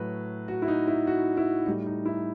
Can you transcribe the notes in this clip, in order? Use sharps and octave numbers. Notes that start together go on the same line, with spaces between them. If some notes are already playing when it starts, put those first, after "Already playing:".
Already playing: A2 F#3 B4
F#4
E4
D#4
E4
F#4
E4
A2 G3 D#4
D#4
E4